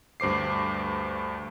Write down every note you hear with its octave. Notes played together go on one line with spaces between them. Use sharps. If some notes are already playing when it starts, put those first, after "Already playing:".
D2 G2 C5 D6 C7